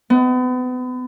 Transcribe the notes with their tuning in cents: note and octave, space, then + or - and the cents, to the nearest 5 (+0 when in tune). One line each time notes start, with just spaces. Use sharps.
B3 +35